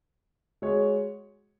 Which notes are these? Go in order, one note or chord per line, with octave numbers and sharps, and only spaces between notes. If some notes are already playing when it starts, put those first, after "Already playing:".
G#3 F#4 C#5